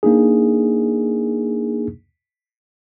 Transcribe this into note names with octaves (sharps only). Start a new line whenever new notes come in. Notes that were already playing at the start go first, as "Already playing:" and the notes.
A#3 D4 D#4 G#4